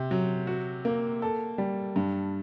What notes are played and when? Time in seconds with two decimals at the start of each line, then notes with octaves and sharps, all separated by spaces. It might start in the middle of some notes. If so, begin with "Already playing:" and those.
Already playing: C3
0.11 F#3
0.47 F#4
0.85 A#3
1.22 A4
1.58 G3
1.96 G2